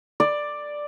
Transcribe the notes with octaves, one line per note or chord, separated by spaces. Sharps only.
D5